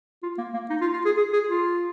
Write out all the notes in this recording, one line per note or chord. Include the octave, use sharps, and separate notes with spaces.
F4
A#3
A#3
D#4
F4
F4
G#4
G#4
G#4
F4